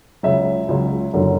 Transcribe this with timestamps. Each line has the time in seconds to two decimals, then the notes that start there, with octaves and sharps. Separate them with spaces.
0.23 C#2 C#3 F#3 E5
0.68 C#2 C#3 F#3
1.13 F#1 F#2 D3 F#3